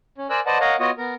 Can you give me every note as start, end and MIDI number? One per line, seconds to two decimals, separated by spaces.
0.18 0.27 61
0.30 0.40 70
0.30 0.40 72
0.30 0.40 74
0.30 0.40 80
0.30 0.40 88
0.30 0.40 90
0.46 0.58 71
0.46 0.58 72
0.46 0.58 74
0.46 0.58 75
0.46 0.58 78
0.46 0.58 81
0.60 0.76 70
0.60 0.76 73
0.60 0.76 75
0.60 0.76 77
0.60 0.76 78
0.80 0.91 59
0.80 0.91 65
0.80 0.91 66
0.80 0.91 73
0.80 0.91 75
0.80 0.91 87
0.98 1.15 59
0.98 1.15 70